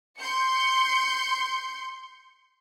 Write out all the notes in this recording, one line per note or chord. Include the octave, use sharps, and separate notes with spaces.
C6 G6 C#7